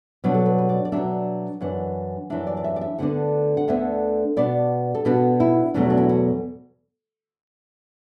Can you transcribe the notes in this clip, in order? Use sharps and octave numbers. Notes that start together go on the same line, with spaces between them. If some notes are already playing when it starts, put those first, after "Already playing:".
B2 F#3 D4 B4
A4
B4
B4
D5
D5
B2 F#3 D4 E5
F#2 E3 D4 F#5
F#2 E3 D4 E5
D5
D5
E5
D5
E5
D2 D3 B3 D4 F#5
F#5
D2 D3 B3 D4 E5
B2 B3 D4 D5
A4
B2 B3 D4 F#4
E4
E2 B2 F#3 A3 D4
D4
E4
F#4